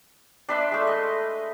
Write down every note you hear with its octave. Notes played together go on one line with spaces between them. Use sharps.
D4 B4 E5 C6
G#3 A3
D#5